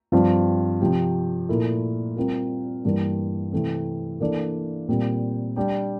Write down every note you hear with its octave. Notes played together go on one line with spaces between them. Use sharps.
G2 F3 C4 F4 C5
C3 F3 C4 G4
A#2 A3 E4 A#4
G3 C4 F4 A#4
G2 E3 G3 A#3
C3 E3 A3 C4
E3 A#3 D4 A4 D5
A#2 G3 C4 G4
G3 D4 G4